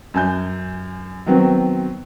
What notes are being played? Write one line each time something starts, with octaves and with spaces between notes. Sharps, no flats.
F#2 G#5 G6
D#3 F#3 B3 C4